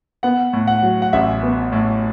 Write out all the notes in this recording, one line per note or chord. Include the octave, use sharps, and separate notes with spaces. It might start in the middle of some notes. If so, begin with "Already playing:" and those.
B3 F#5
A2
F#5
F#3
F#5
A1 E5
B3
A2